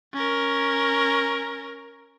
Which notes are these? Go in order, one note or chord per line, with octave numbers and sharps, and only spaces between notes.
C#4 A#4